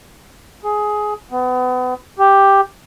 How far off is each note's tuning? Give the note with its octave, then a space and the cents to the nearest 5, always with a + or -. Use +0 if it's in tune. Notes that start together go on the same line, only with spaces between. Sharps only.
G#4 +15
B3 +35
G4 +5